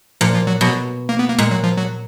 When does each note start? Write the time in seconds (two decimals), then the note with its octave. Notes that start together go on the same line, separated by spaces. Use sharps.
0.21 A#2 F3
0.34 F3
0.47 F#3
0.61 B2 F#3
1.09 A#3
1.19 B3
1.28 A#3
1.39 A#2 G#3
1.51 F#3
1.64 F3
1.77 F#3